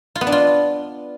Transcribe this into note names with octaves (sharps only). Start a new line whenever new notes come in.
F4
B3
D4
F4